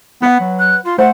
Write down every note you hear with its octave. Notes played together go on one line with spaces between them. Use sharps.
B3 B4 F#5
F#3
F#6
F4 C6
A3 C5 F#5